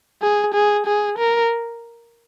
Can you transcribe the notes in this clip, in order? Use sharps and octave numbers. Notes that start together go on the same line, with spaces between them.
G#4
G#4
G#4
A#4